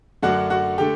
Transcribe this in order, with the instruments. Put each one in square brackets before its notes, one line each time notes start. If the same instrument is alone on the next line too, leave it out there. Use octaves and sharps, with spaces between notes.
[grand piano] F#2 D3 A3 D4 F#4 F#5
F#4 F#5
D3 A3 G4 G5